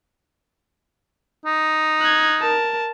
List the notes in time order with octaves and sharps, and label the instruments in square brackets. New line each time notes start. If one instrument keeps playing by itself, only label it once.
[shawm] D#4
[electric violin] F#6 G#6
A#4 A5